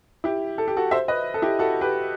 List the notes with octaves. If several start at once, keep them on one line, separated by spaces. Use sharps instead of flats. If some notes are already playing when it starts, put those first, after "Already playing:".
E4 G4
A4
G4
F#4 A4
C5 E5
B4 D#5
A4
E4 G4
F#4 A4
G4 B4